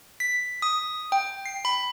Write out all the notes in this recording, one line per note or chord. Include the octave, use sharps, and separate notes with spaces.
B6
D#6
G5
C7
B5